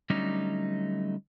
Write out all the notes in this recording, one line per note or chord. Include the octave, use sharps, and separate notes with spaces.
D3 F#3 G3 A3 C#4 D#4